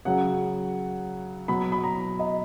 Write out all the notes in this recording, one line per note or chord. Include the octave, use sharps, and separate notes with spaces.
C#3 F#3 F#5
B2 F#3 B5
B5
A#5
D#5